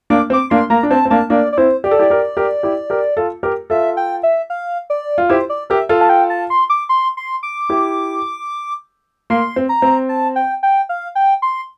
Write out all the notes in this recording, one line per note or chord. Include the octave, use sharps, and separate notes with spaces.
A#3 D4 D6
C4
D6
A#3 D4 C6
A#3 A#5
D4
C4 A5
C4
A#3 D4 A5
A#3 D4 D5
D5
C4 E4 C5
G4 D5
A4
E4 G4
G4 A#4
G4 A#4
E4 G4
G4 A#4
F4 A4
G4 A#4
F4 A4 E5
G5
E5
F5
D5
F4
E4 G4 C5
D5
G4 A#4 E5
F4 A4 F5
A5
G5
A5
C6
D6
C6
C6
D6
E4 G4
A#3 C6
C4
A#5
C4
A5
G5
G5
F5
G5
C6